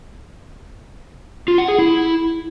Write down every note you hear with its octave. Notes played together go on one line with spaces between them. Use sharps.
F4
F#5
G#4
E4